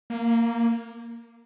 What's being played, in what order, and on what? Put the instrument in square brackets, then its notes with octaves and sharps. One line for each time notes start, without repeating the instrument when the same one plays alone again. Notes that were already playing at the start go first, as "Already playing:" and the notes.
[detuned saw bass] A#3